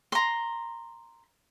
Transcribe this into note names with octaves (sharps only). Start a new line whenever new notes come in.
A#5 C6